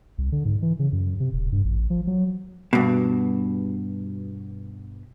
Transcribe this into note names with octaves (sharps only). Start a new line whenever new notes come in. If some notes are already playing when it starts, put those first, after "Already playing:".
C2
D3
G#2
E3
C#3
F#2
C3
D#1
G2
A1
F3
F#3
G2 B2